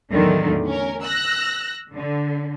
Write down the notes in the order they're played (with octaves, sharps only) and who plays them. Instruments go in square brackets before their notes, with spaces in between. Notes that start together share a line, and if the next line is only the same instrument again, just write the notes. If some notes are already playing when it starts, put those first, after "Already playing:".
[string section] E2 A2 D3 D#3 F#3 A3
C#4 A#4
E6 F#6 A#6
D3